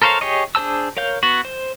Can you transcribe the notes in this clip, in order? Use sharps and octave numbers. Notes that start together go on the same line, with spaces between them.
A4 A#4 C5 C#5 F5
G4 G#4 C#5 D#5
D4 G#4 C5 A5 E6
A#4 C#5 F5 G6
B3 F#4
C5